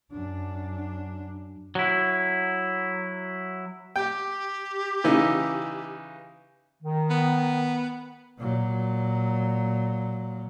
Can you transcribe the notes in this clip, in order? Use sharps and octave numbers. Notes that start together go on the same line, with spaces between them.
F#2 D4
F#3 E4
G4 G5
C#3 E3 D#4
D#3
B3
A#2 F#3